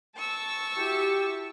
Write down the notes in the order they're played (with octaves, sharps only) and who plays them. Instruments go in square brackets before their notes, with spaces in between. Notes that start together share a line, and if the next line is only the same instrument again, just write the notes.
[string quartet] A5 C#6 E6
[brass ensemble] E4 F#4 G4